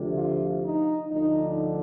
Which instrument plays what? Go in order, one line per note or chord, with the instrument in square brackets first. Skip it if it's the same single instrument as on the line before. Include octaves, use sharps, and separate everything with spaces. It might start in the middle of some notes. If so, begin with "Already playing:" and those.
Already playing: [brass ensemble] D2 C3 F3
F4
D#4
D2 D3 F3 D#4